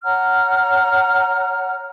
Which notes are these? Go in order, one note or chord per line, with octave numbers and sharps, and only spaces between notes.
C#5 F#5 A#5 F6